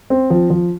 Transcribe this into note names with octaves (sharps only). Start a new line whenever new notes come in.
C4
F3
F3